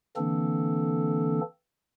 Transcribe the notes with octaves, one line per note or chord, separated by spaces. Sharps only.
D3 E3 A#3 C4 D4 A4